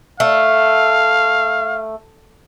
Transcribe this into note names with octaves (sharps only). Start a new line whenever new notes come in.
A3 F5